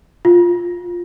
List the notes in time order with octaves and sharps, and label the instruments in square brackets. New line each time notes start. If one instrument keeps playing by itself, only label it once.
[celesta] F4